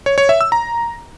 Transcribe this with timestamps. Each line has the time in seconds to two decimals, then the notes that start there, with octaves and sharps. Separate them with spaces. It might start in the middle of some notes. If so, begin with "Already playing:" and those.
0.06 C#5
0.18 C#5
0.29 E5
0.41 E6
0.52 A#5